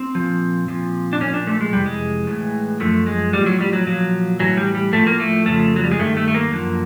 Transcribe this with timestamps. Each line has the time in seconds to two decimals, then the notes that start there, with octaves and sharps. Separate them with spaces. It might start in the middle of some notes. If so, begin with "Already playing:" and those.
Already playing: C4
0.15 A#2 F3
0.68 A#2 F3
1.13 D4
1.21 A#2 F3 C#4
1.34 D4
1.47 A3
1.61 G#3
1.73 F2 C3 E3 G3
1.86 G#3
2.27 A2 E3
2.80 F#2 D3 F3 A3
3.07 G#3
3.33 A2 F3 G3
3.46 F#3
3.61 G3
3.73 F#3
3.86 A#2 F3 F#3
4.40 A2 E3 F#3
4.57 G3
4.75 G3
4.93 A2 F3 A3
5.07 A#3
5.20 A3
5.45 F2 C#3 F3 A3
5.76 F#3
5.84 G3
5.91 G#3
5.99 G2 D#3 A3
6.17 A3
6.28 A3
6.35 A#3
6.52 F#2 D3 F3